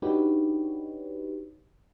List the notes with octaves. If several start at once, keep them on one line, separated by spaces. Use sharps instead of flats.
D4 D#4 F#4 G4 B4 C#5